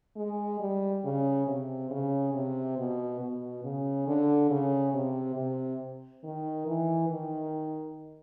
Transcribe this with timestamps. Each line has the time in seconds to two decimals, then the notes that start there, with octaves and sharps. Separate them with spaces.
0.16 G#3
0.60 G3
1.04 C#3
1.47 C3
1.91 C#3
2.34 C3
2.77 B2
3.21 B2
3.64 C#3
4.07 D3
4.51 C#3
4.93 C3
5.36 C3
6.24 D#3
6.67 E3
7.09 D#3